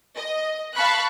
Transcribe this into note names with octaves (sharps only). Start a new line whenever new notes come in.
D#5
F5 A5 B5 C#6 F#6